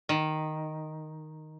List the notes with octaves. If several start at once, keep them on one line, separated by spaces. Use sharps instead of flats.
D#3